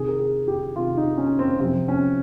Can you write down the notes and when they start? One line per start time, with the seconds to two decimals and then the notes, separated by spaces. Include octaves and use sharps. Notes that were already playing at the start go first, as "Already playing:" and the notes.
Already playing: C3 D#3 G#4
0.08 A#4
0.20 G#4
0.47 G4
0.76 C3 D#3 F4
0.97 D#4
1.18 C#4
1.39 C4
1.60 C3 F3 C4
1.88 C#4